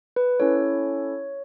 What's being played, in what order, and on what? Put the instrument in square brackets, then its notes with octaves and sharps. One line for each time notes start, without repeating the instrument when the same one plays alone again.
[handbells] B4
C#4 E4 A4 C#5